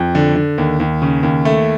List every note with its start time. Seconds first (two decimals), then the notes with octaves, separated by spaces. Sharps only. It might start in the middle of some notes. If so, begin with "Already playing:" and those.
Already playing: F2
0.15 D3
0.36 D3
0.58 D#2
0.80 D#2
1.02 C#3
1.23 D#2
1.45 A3